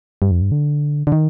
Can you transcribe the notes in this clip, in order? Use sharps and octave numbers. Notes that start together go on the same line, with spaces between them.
G2
F2
G2
D3
D3
D#3